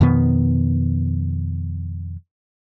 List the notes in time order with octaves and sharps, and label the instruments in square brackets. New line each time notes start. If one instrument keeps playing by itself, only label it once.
[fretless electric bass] F2 B2 D#3 B3